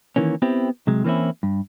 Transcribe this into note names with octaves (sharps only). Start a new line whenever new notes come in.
D#3 E3 A#3 C#4
B3 C4 E4 G4
C3 F#3 G#3
E3 A#3 C4 C#4 E4
G2